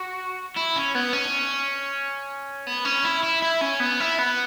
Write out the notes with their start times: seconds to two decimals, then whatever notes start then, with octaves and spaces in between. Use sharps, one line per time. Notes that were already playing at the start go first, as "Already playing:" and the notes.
Already playing: F#4
0.56 E4
0.76 C#4
0.95 B3
1.13 C#4
2.67 B3
2.85 C#4
3.04 E4
3.23 E4
3.42 E4
3.61 C#4
3.80 B3
4.00 E4
4.18 B3